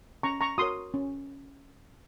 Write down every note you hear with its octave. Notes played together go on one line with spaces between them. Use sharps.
C#4 A#5 C#6
A#5 C#6
F#4 A#4 C#5 C6 D#6
C#4